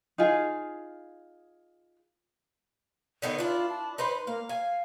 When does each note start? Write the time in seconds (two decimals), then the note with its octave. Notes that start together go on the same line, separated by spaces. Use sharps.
0.18 D#4 F4 G#4 F5
3.22 D3 D#3 B3
3.39 D4 E4 F4
3.69 A5
3.98 D#4 B4 C5 B5
4.27 A#3 F5
4.49 F5 G#5